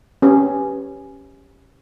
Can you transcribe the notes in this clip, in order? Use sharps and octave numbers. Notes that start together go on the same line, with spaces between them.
C#4 G4 B4